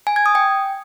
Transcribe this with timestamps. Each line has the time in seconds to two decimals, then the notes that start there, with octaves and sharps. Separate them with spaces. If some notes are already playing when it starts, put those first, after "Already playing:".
0.07 G#5
0.16 G#6
0.26 D#6
0.35 G5